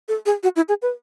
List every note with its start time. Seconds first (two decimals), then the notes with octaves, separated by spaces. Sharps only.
0.08 A4
0.26 G#4
0.43 F#4
0.56 E4
0.69 G#4
0.82 B4